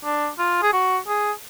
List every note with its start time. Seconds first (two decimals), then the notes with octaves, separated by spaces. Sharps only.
0.04 D4
0.39 F4
0.63 G#4
0.73 F#4
1.08 G#4